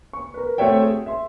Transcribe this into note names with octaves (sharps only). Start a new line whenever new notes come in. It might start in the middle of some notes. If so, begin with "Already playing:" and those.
C#6
A#4 B4
A3 C4 F#4 C#5 E5 G5
G#4
E5 C6